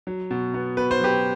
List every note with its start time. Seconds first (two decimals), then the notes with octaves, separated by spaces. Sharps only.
0.07 F#3
0.31 B2
0.54 B3
0.77 B2 B4
0.91 C5
1.00 F#3 G4 B4